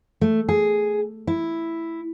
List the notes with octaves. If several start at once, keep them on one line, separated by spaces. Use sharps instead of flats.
A3
G#4
E4